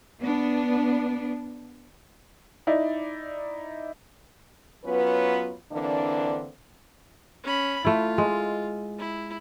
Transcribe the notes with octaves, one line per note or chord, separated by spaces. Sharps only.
B3 D4
D#4 E4 D5
F#3 B3 C#4 F4 B4
D3 E3 A#3 C4 D4
C#4 B5
A3 E4 F4
G#3
E4